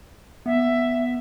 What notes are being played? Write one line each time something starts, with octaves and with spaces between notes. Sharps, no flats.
B3 E5